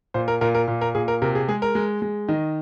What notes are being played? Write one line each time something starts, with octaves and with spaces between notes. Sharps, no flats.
A#2 C5
A#4
A#2 A#4
A#4
A#2
A#4
A#2 G#4
A#4
C3 A#4
G#4
G#3 G#4
A#4
G#3
G#3
D#3 D#5